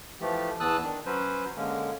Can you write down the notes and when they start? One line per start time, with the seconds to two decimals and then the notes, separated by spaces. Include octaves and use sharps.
0.21 E3 F3 A3 G4
0.60 E2 E3 A5 D#6 E6 F#6
0.84 D#3 D4
1.06 F#3 C#4 B4 C5
1.57 D3 G#3 A#3 C#4